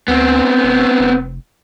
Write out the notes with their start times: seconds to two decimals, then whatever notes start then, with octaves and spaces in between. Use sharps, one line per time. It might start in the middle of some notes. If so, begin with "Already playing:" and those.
0.08 D2 B3 C4
0.63 D#1
0.99 F1